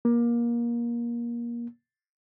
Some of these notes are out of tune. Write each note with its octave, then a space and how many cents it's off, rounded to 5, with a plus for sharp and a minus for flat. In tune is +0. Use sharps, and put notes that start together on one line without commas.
A#3 +25